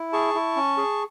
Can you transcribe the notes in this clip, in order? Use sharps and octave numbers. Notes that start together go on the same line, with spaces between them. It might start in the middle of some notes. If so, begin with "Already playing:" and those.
Already playing: E4
G#4 A5 C#6
E4
C#4
G#4